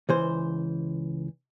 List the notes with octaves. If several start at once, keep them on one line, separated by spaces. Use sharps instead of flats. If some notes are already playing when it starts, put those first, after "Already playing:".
C#2 E3 C5